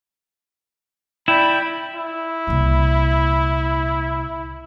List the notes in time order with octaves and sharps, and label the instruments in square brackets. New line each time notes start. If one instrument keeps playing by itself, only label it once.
[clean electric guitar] E4 [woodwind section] D5 G5 B5
[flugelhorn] E4
[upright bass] C2 A#2